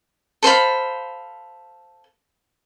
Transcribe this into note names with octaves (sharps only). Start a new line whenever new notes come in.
A4 C5 F5 B5